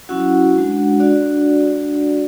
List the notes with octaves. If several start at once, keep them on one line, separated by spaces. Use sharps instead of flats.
F#3 C#4 E4 F#4 F#5
G#3 D4 F#4
D4 F#4 D5